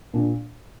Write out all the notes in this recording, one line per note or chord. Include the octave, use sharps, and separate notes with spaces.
A#2 D4